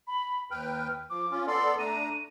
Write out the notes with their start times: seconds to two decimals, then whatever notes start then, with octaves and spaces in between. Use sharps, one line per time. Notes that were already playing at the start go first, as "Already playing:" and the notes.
0.07 B5
0.51 D#2 B4 G5 F6
1.10 F3 D6
1.31 C#4 F4
1.47 B3 A4 D5 C6
1.79 A3 D4 A#5 D#7